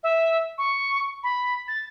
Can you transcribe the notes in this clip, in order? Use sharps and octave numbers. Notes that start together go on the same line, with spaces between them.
E5
C#6
B5
A6